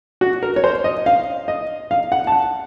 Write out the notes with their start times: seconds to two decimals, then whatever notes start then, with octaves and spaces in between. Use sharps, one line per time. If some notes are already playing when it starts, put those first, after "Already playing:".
0.21 F#4
0.43 A#4
0.56 C#5
0.64 C5
0.84 D#5
1.06 F5
1.48 D#5
1.91 F5
2.12 F#5
2.27 A5
2.32 F#5